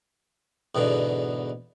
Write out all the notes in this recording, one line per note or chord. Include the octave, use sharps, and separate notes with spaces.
E2 G#2 B2 D3